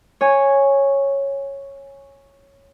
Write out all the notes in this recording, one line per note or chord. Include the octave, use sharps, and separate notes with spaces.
C#5 G#5